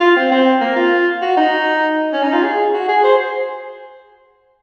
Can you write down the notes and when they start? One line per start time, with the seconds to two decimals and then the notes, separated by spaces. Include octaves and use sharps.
0.01 F4
0.16 C4
0.31 C4
0.61 A#3
0.76 F4
1.22 F#4
1.37 D#4
2.13 C#4
2.23 D#4
2.33 F4
2.43 G#4
2.74 F#4
2.89 G#4
3.04 C5